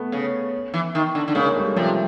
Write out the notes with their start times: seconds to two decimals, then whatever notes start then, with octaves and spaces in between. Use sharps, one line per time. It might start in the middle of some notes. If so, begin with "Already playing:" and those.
Already playing: A3 B3
0.12 C#3
0.74 E3
0.95 D#3
1.15 D3
1.28 D3
1.35 C#3 G#3 A#3
1.56 G3 A3
1.76 C3 F3 G3